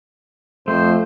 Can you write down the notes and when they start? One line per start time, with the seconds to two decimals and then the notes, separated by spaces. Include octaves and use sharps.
0.68 F2 F3 A3 C5